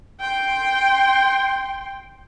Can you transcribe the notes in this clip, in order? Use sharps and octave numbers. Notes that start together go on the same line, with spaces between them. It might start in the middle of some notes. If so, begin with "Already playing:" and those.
G5 C6